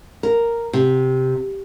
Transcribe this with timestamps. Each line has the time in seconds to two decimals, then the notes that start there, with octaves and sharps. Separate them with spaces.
0.23 A#4
0.73 C3